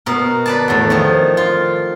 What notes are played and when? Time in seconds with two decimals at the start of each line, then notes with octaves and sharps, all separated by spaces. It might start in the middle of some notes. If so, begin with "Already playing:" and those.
0.06 B2 A#4
0.46 B4 D5 A5
0.68 E2 A2
0.90 D#3 F3
1.37 F4